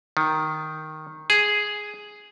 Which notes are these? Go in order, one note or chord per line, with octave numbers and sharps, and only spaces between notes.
D#3
G#4